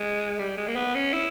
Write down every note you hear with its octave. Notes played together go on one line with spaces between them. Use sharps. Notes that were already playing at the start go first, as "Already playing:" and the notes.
Already playing: G#3
G3
G#3
A#3
B3
C#4
E4